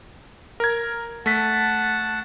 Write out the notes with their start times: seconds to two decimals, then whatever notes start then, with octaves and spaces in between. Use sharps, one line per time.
0.60 A#4 G#6
1.26 A3 F#5 A5 B6